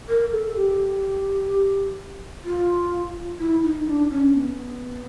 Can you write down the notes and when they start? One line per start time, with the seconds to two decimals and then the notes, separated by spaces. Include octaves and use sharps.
0.09 A#4
0.32 A4
0.56 G4
2.45 F4
3.39 E4
3.63 D#4
3.87 D4
4.11 C#4
4.34 B3